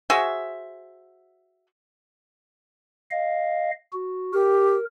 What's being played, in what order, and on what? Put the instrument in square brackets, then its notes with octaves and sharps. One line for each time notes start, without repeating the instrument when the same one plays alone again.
[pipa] F#4 G#4 C5 E5
[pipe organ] D#5 F5
F#4
[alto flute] G4 [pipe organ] A#4